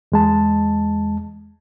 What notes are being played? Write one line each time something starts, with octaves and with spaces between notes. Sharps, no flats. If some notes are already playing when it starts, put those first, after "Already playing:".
E2 G#3 A5